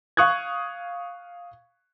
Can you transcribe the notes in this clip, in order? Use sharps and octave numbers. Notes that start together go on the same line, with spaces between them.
F5 C#6 D#6 F#6 G#6